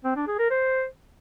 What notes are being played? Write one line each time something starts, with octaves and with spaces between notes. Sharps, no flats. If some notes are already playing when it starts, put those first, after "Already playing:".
C4
D4
G#4
A#4
C5